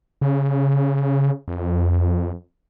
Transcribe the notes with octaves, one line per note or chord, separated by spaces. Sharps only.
C#3
F2